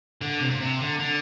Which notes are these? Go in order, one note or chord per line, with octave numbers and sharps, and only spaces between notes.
D3
C3
A#2
C3
D3
D3